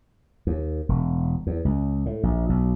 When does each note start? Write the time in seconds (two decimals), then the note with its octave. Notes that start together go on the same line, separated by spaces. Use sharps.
0.47 D#2
0.89 E1
1.47 E2
1.65 C#2
2.06 A2
2.23 A#1
2.49 B1